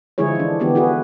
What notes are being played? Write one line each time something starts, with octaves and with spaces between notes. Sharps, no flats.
D3 F3 G#3 E4 G#4 C#5
E3 D4
D3 E3 B3 G4
E4 F#4 G#4 B4